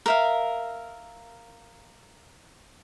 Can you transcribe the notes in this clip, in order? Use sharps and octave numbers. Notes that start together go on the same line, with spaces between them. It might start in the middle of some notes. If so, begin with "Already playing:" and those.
A#4 E5 F5